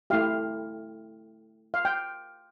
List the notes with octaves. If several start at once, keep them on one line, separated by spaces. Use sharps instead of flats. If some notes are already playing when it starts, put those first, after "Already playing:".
A3 E4 G4 F5
F5
G5